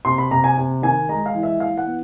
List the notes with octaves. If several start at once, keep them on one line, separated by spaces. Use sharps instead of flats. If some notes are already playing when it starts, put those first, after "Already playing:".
C3 C6
B5
C3 A#5
G#5
C3
D#3 G#5
G#3 A#5
F5
E3
E5
E3 F5
F#5
B3